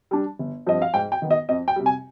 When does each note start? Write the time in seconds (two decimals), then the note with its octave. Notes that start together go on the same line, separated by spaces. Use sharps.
0.11 G3 D4
0.39 G1
0.66 G2 F3 C4 D#5
0.82 F5
0.94 G#2 G5
1.12 G5
1.22 D#3 B3
1.31 D#5
1.49 F2 D#5
1.68 G5
1.76 C3 G3
1.86 G#5